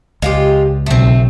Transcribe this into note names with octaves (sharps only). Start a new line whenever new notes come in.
C#2 G#3 F4 G4
B1 A3 C4